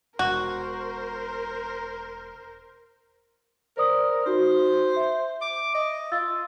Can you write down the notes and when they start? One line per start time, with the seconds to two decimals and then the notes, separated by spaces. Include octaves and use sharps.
0.19 E1 F#4 A#4 C5
3.77 A#4 C5 D5 D#6
4.26 D#4 F#4 C5
4.96 E5
5.42 D6
5.74 D#5
6.12 F4 E6 A6